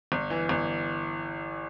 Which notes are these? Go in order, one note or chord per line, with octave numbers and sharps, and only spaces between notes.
G1
E3
G1